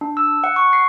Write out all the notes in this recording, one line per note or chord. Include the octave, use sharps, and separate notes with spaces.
D4
E6
F#5
C#6
C7